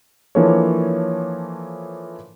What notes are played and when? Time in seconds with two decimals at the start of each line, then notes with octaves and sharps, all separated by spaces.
0.35 E3 F3 A#3 D4 A4 C#5